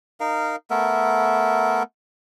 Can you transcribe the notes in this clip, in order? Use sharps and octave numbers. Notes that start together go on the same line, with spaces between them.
D#4 A#4 F5
A3 B3 A#4 E5